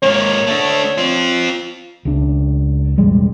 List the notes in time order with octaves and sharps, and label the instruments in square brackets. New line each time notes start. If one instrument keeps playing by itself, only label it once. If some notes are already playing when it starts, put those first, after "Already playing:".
[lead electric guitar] G#2 A#3 [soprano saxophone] C#5
[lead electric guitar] A3 D4
C4 F4
[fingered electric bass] C#2 D4
E1 A1 G3 G#3